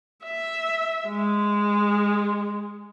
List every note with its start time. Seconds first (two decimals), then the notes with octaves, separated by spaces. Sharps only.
0.25 E5
1.08 G#3